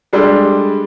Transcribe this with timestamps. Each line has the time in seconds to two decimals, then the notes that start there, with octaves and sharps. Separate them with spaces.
0.13 G3 G#3 D4 A4